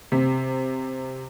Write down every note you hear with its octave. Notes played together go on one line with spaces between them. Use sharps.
C3